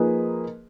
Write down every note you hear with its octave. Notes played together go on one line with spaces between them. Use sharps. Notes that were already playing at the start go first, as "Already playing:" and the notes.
Already playing: F3 A#3 D#4 G#4 B4